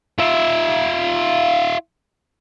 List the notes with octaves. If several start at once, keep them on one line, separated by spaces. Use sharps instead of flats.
F4 E5